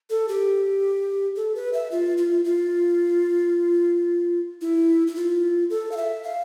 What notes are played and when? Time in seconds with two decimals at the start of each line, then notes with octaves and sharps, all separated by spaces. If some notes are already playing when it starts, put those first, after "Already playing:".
0.10 A4
0.29 G4
1.36 A4
1.55 B4
1.73 E5
1.91 F4
2.18 F4
2.45 F4
4.61 E4
5.08 E4
5.16 F4
5.70 A4
5.92 F5
5.97 E5
6.23 F5